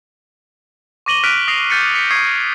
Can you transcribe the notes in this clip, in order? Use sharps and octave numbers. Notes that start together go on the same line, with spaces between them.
C#6 D6 A#6 D#7 F#7 G7
F6 F#6 B6 D7 D#7 F7
D#6 A#6 C7 F7
F6 G6 A6 B6 C#7 D#7
B6 C#7
C#6 D#6 G#6 C7